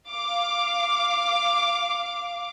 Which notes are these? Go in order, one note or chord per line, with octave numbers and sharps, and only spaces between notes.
F5 D6